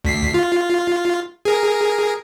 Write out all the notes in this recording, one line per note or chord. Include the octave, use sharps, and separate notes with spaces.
D2 B6 C7
F4
G#4 A#4